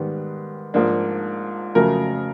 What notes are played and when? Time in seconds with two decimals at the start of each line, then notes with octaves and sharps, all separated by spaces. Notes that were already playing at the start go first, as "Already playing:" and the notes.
Already playing: G#2 D#3 G3 B3
0.74 G#2 F3 A#3 D4
1.75 F2 C#3 F#3 A3 A#4